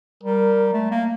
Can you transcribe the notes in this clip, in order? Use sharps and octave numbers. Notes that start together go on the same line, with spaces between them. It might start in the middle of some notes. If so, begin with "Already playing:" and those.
G3 A#4
A3
A#3